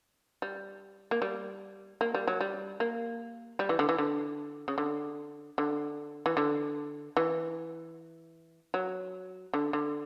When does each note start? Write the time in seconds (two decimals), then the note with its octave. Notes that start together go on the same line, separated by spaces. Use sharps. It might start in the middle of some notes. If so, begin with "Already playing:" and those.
0.42 G3
1.11 A#3
1.22 G3
2.01 A#3
2.14 G3
2.27 F#3
2.41 G3
2.80 A#3
3.59 G3
3.69 E3
3.79 D3
3.89 E3
3.98 D3
4.68 C#3
4.78 D3
5.58 D3
6.26 E3
6.37 D3
7.17 E3
8.74 F#3
9.54 D3
9.73 D3